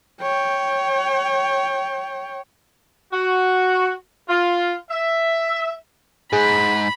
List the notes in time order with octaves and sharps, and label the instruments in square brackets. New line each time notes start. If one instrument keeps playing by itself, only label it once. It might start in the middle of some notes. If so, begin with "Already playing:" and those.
[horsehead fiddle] C#5 G5
[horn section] F#4
F4
E5
[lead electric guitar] G#2 [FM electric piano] G#4 [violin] B5